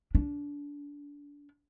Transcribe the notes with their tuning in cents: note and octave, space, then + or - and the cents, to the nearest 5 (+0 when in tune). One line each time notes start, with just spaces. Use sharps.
D4 -25